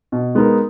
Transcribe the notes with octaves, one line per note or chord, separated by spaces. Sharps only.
B2
G#3 B3 D#4 A#4